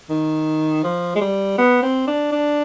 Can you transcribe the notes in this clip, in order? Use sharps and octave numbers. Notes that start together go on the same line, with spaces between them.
D#3
F3
G#3
G3
B3
C4
D4
D4